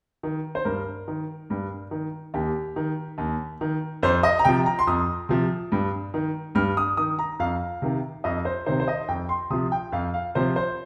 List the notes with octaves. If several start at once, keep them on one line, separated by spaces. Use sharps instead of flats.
D#3
C5
G2 A#4
D#3
G2
D#3
D#2 G4
D#3
D#2
D#3
F2 C5
D#5
A#5
C3 F3 G5
A#5
C6
F2 D#6
C3 F3
G2
D#3
G2 F6
D#6
D#3 D#6
A#5
F2 F5
C3 D#3
F2 D#5
C5
C3 D#3 C5
C5
D#5
F2 G5
C6
C3 F3 D#6
G5
F2 F5
F5
C3 F3 C5
C5